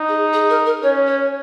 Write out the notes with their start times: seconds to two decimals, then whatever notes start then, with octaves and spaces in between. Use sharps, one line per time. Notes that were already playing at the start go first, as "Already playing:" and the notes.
Already playing: D#4
0.08 G#4
0.33 G#4
0.50 A#4
0.66 A#4
0.82 C#4 C#5
1.07 C#5